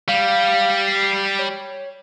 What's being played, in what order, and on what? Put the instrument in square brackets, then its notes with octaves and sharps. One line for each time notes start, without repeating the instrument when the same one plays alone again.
[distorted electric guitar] G3 [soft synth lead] F5
[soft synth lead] C7
C#5